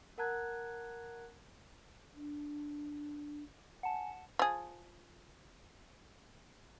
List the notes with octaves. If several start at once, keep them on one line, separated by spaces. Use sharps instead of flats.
A#4 F#5 A5 A#5 F#6 G#6
D4
F#5 G#5 A5
F3 G#4